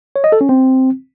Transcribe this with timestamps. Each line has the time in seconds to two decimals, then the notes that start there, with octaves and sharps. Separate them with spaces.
0.16 C#5
0.24 D#5
0.32 A4
0.41 C#4
0.49 C4